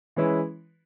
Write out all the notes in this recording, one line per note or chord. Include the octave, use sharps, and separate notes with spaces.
E3 G#3 C#4 E4 B4